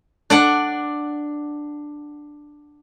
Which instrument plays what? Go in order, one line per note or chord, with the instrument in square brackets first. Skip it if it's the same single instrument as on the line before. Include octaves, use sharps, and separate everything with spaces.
[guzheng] D4 D5 F#5